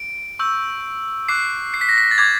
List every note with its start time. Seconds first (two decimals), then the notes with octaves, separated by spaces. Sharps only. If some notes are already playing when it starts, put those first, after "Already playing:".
Already playing: D7
0.39 C#6 E6 G6
1.29 D6 F#6 C7
1.74 C7
1.81 B6
1.89 A#6
1.98 B6
2.11 A6
2.18 D6 G6 G#6